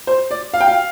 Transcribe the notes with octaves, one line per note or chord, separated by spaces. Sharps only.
C5
D5
F5
G5
F5